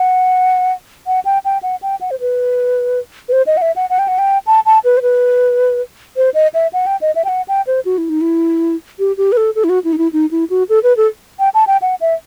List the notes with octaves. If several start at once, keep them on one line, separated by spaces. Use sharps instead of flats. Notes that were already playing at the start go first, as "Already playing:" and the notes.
Already playing: F#5
F#5
G5
G5
F#5
G5
F#5
C5
B4
B4
C5
D#5
F#5
E5
F#5
F#5
G5
F#5
G5
A5
A5
B4
C5
B4
C5
D#5
E5
F#5
G5
D#5
E5
G5
F#5
G5
C5
F#4
E4
D#4
E4
G4
G4
B4
A4
A4
E4
F#4
E4
D#4
E4
D#4
E4
F#4
A4
B4
A4
G5
A5
G5
F#5
E5